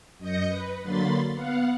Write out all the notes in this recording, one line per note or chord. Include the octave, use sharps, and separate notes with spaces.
F#2 D#5 D#6 G6 A#6 C#7
B4
D3 F#3 A#3 B5 C6 A6
B3 F5 F#5